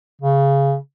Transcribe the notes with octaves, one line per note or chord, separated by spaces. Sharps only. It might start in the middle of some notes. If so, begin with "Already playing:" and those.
C#3